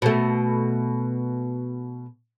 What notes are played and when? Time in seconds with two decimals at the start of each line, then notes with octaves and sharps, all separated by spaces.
0.02 B2 A3